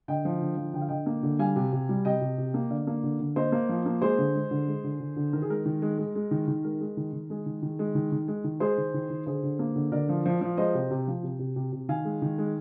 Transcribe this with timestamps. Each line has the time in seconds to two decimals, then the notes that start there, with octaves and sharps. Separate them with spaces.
0.08 D3 D#5 G5
0.25 F3
0.41 D3
0.57 F3
0.74 D3 G5
0.81 F5
0.89 D3 D#5 G5
1.06 A#3
1.23 D3
1.39 G3 F5 G#5
1.56 C3
1.73 C3
1.89 G3
2.05 C3 D#5 G5
2.21 C3
2.38 C3
2.54 A#3
2.70 D3 D5 F5
2.87 A#3
3.03 D3
3.20 D3
3.36 A#3 C5 D#5
3.52 A#3
3.69 F3
3.85 A#3
4.02 G#3 G#4 C5
4.18 D3
4.35 G#3
4.51 D3
4.67 G#3
4.84 D3
5.00 D3
5.16 D3
5.33 D#3 A#4
5.42 G#4
5.50 G#3 A#4
5.65 D#3
5.82 G#3
5.98 G#3
6.15 G#3
6.31 D#3
6.48 D#3
6.64 G#3 A#4
6.81 G#3
6.97 D#3
7.13 D#3
7.30 G#3 G#4
7.46 D#3
7.62 D#3
7.79 G#3
7.95 D#3
8.12 D#3
8.28 G#3
8.44 D#3
8.60 G#3 G#4 C5
8.78 D#3
8.94 D#3
9.10 D#3
9.26 D3 G#4 C5
9.43 D3
9.59 A#3
9.76 D3
9.92 D3 A#4 D5
10.09 F3
10.26 F3
10.41 F3
10.57 G#3 C5 D#5
10.74 C3
10.90 C3
11.08 F3
11.23 C3
11.39 C3
11.56 C3
11.72 C3
11.89 D#3 F5 G#5
12.05 G#3
12.22 D#3
12.38 G#3